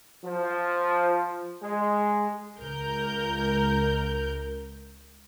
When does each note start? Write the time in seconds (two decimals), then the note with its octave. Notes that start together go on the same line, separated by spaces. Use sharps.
0.22 F3
1.61 G#3
2.59 C#2 A#4 G6